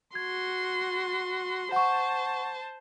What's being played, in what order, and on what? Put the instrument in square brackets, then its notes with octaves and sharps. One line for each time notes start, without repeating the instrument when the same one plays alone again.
[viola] F#4 C6 [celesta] G#6
[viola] C5 A5 [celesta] F#5 C#6